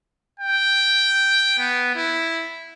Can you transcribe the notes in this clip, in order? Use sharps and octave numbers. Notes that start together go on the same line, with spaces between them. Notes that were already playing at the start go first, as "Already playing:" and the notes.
G5
B3
E4